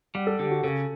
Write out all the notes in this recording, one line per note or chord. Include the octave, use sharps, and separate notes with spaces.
G3 F#5
A4
D3 G4
F#4
C#3 A4